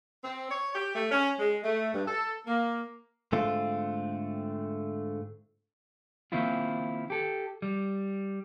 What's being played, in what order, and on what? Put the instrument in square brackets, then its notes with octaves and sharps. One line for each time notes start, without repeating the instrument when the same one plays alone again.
[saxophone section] C4
C#5
G4
A3
C#4
G#3
A3
G2
A4
A#3
[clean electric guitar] G#2 D3 A3 C4 F4
D#3 A#3 C4 E4 F4
G4 A4
G3